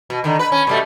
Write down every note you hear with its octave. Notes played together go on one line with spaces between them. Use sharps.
B2
D3 D#3
B4
C#4
B2 G3 A3